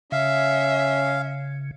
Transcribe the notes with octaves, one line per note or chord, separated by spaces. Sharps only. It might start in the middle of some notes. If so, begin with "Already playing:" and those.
C#3 C#4 E5 F5